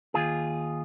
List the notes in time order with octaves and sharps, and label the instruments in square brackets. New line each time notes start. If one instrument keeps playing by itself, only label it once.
[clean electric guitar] D#2 F4 G#4